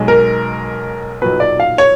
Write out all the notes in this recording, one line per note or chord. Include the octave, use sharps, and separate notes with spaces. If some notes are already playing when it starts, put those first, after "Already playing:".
Already playing: B1 B2 G#3
A#4
B1 A#2 F#3 B4
D5
F5
C#5